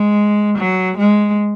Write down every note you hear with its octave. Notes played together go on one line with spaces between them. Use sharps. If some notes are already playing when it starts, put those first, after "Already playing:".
Already playing: G#3
F#3
G#3